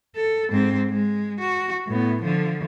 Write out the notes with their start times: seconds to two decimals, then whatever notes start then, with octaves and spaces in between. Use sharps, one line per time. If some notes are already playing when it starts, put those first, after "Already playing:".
0.16 A4
0.52 G#2 C4
0.90 G#3
1.40 F#4
1.88 A2 B3
2.21 D3 F3